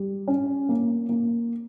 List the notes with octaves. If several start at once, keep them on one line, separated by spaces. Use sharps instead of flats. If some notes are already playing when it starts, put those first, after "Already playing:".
Already playing: G3
C#4
A#3
A#3